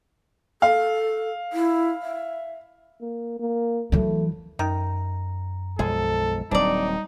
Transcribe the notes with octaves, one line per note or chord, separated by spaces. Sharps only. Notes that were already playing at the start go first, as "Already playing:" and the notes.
A4 F5
E4
E5
A#3
A#3
E3 F#3 A3
F#2 D#3 A#5
B1 F3 G#3 G#4 A4
D#1 F#3 G3 C4 D4 D#4 D5